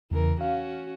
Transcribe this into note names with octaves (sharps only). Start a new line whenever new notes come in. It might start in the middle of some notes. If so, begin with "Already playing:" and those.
E2 C#3 E3 A#4
C#4 F#4 F5